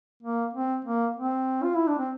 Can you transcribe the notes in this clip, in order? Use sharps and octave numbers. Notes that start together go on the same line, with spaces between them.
A#3
C4
A#3
C4
F4
E4
D4
C4